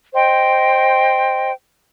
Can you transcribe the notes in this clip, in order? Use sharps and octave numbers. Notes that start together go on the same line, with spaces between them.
C5 D#5 G5 C6